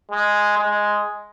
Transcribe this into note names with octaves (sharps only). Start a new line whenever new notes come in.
G#3
G#3